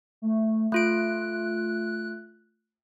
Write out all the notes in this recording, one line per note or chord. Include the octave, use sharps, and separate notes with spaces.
A3
A3 F4 F#6 D7